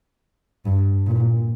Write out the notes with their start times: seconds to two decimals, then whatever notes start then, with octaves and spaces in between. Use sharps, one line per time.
0.65 G2
1.06 A#2